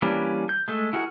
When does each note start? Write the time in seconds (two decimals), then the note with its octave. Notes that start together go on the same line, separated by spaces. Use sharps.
0.02 E3 G3 A#3 C#4 D4
0.49 G6
0.68 G#3 A3 A4
0.93 E4 F#4 G#4 A#4 F#5